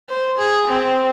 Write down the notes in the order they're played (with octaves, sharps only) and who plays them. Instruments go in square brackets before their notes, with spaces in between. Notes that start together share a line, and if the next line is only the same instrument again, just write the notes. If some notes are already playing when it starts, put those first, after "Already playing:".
[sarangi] C5
G#4
C4